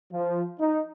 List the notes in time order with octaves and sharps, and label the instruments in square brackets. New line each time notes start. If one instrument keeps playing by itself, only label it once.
[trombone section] F3
D#4